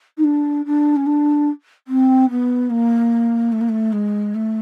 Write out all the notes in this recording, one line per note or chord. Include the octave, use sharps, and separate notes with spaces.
D#4
D4
D4
C#4
D4
C4
B3
A#3
A3
A#3
A3
G#3
A3